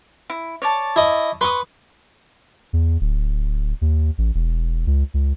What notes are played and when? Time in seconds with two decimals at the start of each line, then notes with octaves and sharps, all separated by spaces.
0.30 E4
0.62 C#5 D5 A5
0.96 E4 D#5
1.41 B4 C6 C#6 D#6
2.73 E2
3.01 D1
3.81 D#2
4.18 A1
4.35 E1
4.87 C#2
5.14 C#2